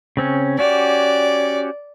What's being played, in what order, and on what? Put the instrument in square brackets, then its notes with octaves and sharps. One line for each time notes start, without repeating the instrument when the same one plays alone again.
[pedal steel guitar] C#3 C4 C#4
[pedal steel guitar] C#4 F#4 G4 [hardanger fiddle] D5